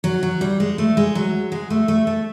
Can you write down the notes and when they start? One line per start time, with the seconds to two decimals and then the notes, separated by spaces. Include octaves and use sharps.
0.04 F#3
0.23 F#3
0.41 G3
0.60 G#3
0.78 A3
0.97 G#3
1.15 F#3
1.52 G#3
1.70 A3
1.88 A3
2.07 A3